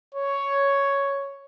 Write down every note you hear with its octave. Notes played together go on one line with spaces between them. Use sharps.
C#5